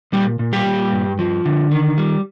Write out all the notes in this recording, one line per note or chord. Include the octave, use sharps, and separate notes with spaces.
A#2 G3 G4
A#2
G3 G4
A#2
G2
F3
D3
D#3
G3